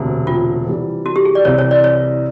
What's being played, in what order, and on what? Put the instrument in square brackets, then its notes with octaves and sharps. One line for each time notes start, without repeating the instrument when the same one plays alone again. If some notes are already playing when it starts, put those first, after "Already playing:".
Already playing: [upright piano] E1 D2 C3
[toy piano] F4
[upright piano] C3 E3 G3
[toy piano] F#4
G4
G#4
D5
[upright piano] C2 C3 E3 [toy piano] C#5
[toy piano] C#5
D5
C#5